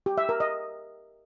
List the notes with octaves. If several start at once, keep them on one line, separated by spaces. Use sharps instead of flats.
G4
E5
A#4
D#5